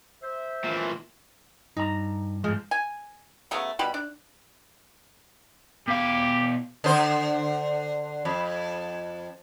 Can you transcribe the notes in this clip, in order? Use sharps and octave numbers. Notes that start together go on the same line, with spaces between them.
C5 E5
A#2 E3
G2 D#4 A#5
G#2 F3 G#3
G#5
C#3 F#3 A3 B3
B2 G3 B5
D4
B2 G4 F5
D3 C5
F2